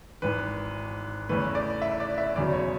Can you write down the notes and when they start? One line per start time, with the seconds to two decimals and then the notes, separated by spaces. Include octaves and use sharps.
0.22 G#1 G#2 E3 B4
1.29 E2 C#3 E3 A3 B4
1.55 D5
1.82 E5
2.00 D5
2.18 E5
2.36 E1 E2 C#3 F#3 D5
2.53 C#5